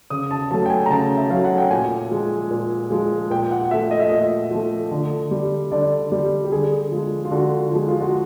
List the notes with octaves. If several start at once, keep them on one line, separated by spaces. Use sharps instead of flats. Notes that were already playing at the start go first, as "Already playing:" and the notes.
C#3 D#6
A5
F#3 A3 A5
G5
G#5
A#5
C#3 A5
E5
F#3 A3 F5
F#5
G5
A#2 G#5
F3 G#3
A#2
F3 G#3
A#2 G5
F#5
F3 A3 E5
D#5
E5
A#2 D#5
F3 A3
D3
G3
D3 D5
G3
G4
D3 G#4
F3 G#3
F4
D3 F#4
F3 G#3
F4
F#4